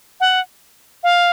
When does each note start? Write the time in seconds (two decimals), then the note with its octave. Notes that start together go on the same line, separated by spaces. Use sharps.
0.20 F#5
1.03 F5